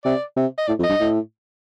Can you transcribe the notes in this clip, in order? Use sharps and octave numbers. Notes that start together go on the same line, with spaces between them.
C3 D5
C3
D#5
A2 D5
F2
D#5
G2
A2